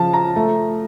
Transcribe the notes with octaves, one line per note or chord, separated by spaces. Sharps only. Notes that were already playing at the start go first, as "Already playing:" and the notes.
Already playing: C#3 F3 F5 A5
A#5
A3